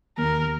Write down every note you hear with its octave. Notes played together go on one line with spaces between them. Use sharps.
D#2 A#4